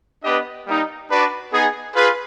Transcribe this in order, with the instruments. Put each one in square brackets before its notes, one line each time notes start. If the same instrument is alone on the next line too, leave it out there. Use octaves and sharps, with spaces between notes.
[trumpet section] B3 D4 G4 B4 D#5
G3 A#3 D#4
D4 F#4 B4 D5
B3 D#4 G#4
F4 G#4 B4